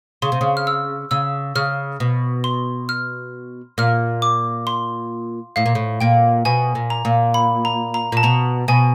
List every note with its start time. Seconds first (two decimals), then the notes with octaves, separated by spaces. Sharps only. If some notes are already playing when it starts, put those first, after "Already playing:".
0.22 C#3 C6
0.32 C3
0.41 C#3
0.57 F6
0.67 E6
1.11 C#3 E6
1.55 C#3 F6
2.00 B2
2.44 C6
2.89 F6
3.78 A#2 F6
4.22 D6
4.67 C6
5.56 A2 F5
5.66 A#2
5.75 A2
6.01 A#2 G5
6.45 B2 G#5
6.75 A#2
6.90 A#5
7.05 A#2
7.34 B5
7.65 A#5
7.94 A#5
8.12 A#2 A5
8.23 B2 A#5
8.68 B2 G#5